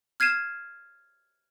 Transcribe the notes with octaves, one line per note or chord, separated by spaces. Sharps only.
F6 G#6 C7 D#7 E7